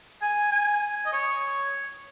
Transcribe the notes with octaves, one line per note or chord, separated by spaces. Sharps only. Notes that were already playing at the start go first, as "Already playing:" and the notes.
G#5
G#5
D#5
C#5